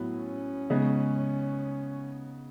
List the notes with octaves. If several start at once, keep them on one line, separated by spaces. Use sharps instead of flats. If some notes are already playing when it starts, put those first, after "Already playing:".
Already playing: A2 F#3 B3
C#4
C#3 G#3 B3 D#4